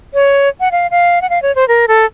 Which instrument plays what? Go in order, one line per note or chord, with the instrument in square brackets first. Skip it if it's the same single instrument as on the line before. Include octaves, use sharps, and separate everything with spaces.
[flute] C#5
F#5
F5
F5
F#5
F5
C#5
C5
A#4
A4